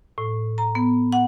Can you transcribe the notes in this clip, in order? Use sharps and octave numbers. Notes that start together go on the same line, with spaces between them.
A2
A#5
B3
F#5